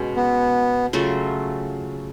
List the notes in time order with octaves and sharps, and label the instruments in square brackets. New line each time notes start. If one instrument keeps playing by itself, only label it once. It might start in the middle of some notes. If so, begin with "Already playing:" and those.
Already playing: [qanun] B2 G#3 C#4
[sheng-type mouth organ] B3
[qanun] C#3 F#3 A3 F4